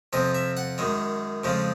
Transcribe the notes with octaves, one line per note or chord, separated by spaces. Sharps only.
F2 C3 F3 D#5
E5
F#5
F#2 D#3 G#3
F2 C#3 F3 G#3